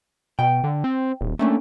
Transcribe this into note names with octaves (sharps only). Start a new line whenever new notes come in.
B2 G5
D3
C4
D#1
A3 A#3 C#4 D4